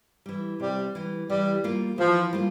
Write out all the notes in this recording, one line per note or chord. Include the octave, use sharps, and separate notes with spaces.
E3 G3
C3 G3
E3 G3
E3 G3
G3 A#3 F4
E3 F3
G3 A#3 F4